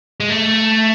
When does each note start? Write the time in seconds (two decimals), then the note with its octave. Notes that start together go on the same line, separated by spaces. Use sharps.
0.20 G#3
0.29 A3